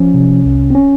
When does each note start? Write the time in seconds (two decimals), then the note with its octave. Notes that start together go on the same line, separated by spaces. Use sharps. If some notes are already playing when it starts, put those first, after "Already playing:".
Already playing: F3 C#4
0.14 C3
0.45 C2
0.70 C4
0.75 C#4